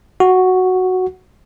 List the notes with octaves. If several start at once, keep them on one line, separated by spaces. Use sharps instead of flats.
F#4